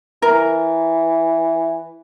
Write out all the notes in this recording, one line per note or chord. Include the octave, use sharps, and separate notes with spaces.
E3 A#4